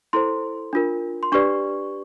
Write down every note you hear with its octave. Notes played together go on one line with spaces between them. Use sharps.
E4 A4 C5 C6
D4 F4 A#4
C6
D4 G4 B4 D5 C#6